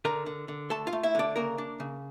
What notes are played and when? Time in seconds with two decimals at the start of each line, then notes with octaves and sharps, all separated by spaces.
0.05 D3 A#4 A#5
0.26 D3
0.48 D3
0.70 A3 A4 A5
0.87 F4 F5
0.93 A3
1.03 E4 E5
1.15 D3 D4 D5
1.36 C#3 A#3 A#4
1.58 D4
1.80 C#3